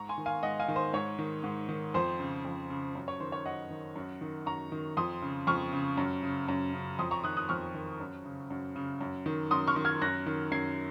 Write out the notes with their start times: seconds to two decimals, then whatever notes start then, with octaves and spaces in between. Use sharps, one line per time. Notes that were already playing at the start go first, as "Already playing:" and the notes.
Already playing: G#2 A#5 C#6
0.09 G#5 C6
0.18 D#3
0.26 F5 G#5
0.43 G#2 D#5 F#5
0.60 F5 G#5
0.68 D#3
0.76 C5
0.93 G#2 C#5
1.19 D#3
1.44 G#2
1.69 D#3
1.94 F2 C5
2.19 C#3
2.45 F2
2.70 C#3
2.95 F#2
3.08 C#5
3.20 D#3 C5
3.32 C#5
3.45 F#2 D#5 F#5
3.70 D#3
3.96 F#2
4.21 D#3
4.46 F#2 A#5 C#6
4.72 D#3
4.97 F2 C6 D#6
5.22 C#3
5.47 F2 C#6 F6
5.73 C#3
5.98 F#2
6.23 C#3
6.48 F#2
6.74 C#3
6.99 F2 C6 D#6
7.11 A#5 C#6
7.24 D#3 D#6 F#6
7.37 D#6 F#6
7.49 F2 C#6 F6
7.74 D#3
8.00 F#2
8.25 C#3
8.50 F#2
8.76 C#3
9.01 F#2
9.26 D#3
9.51 F#2 C6 D#6
9.67 C#6 F6
9.76 D#3
9.85 F6 G#6
10.02 F#2 F#6 A#6
10.26 D#3
10.52 F#2 G#6 C7